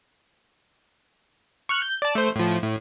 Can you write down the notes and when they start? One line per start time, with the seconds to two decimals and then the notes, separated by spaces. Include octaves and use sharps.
1.69 C#6 F6 F#6
1.82 G6
2.02 D5 A5
2.15 A3 C5
2.36 A2 F3
2.63 A2